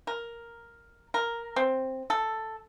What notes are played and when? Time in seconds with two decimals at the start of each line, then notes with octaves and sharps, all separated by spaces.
0.07 A#4
1.14 A#4
1.56 C4
2.10 A4